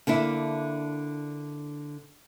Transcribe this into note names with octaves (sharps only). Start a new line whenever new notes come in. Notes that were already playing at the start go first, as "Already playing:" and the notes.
D3 A#3 D4 E4